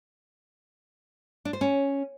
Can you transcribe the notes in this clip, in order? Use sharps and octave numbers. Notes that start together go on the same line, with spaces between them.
D4
C5
C#4